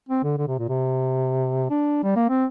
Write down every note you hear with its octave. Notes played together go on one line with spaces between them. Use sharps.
C4
D3
D3
C3
A#2
C3
D4
G3
A#3
C4